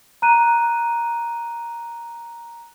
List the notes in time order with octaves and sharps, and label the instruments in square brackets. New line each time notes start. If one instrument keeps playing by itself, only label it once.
[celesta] A#5 F#6 D#7